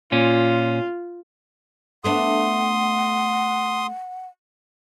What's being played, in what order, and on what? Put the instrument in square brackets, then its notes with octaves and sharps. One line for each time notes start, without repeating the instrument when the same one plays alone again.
[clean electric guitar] A#2 C#4 [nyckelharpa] F4
[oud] A3 B3 D4 [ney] F#5 [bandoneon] C6 D#6